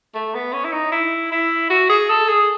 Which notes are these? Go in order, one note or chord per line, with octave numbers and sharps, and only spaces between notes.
A3
B3
C#4
E4
D#4
E4
E4
F#4
G#4
A4
G#4